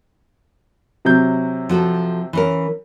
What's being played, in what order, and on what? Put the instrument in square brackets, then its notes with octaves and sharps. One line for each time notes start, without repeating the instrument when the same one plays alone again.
[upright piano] C3 F#3 G6
[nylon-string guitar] F3 F#4 A4
E3 C#4 A#4